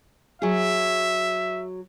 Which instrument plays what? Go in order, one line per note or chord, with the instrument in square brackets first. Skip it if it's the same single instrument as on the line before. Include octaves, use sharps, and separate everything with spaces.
[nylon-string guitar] F#3 G#4 [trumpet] E5